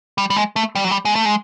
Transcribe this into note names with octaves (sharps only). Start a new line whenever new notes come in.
G3
G3
G#3
A3
G3
F#3
G3
G#3
A3
G#3